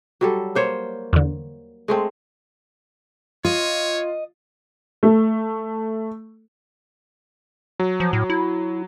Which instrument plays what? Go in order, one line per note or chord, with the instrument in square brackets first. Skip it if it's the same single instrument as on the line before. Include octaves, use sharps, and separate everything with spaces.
[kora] F#3 G3 A4
A#3 C5 C#5
[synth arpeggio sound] E2 D3
[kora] G#3 A3 C4
[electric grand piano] F4 [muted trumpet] C#5 [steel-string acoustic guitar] D#5
[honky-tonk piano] A3
[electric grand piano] F#3
[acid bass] F3
A2
E4